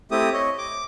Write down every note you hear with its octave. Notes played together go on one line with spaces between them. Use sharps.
A3 C4 E4 G4 D#6
C#5 D#5
D6